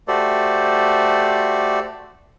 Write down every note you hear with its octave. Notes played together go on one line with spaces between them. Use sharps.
A3 F#4 G4 A4 C5 D5